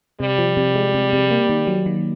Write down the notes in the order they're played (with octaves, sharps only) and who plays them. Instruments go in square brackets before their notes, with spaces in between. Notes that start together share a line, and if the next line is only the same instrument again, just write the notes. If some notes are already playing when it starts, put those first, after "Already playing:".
[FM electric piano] C3 [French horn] G3
[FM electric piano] F3
C3
G#3
C3
C3
A#3
D#3
F#3
D#3